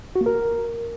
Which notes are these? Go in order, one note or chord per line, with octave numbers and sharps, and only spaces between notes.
F#4
A#3
A#4